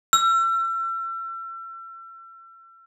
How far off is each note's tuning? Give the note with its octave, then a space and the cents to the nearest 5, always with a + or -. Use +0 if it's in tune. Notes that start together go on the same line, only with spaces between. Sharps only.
E6 +40